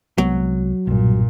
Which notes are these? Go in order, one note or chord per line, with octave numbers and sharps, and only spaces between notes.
C2 F#3 G#3 B3
B1 G2 A#2